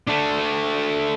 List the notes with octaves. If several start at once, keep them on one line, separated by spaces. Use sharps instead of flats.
A3 D4